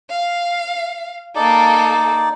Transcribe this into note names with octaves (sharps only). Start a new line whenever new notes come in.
F5
A#3 D#4 A4 D5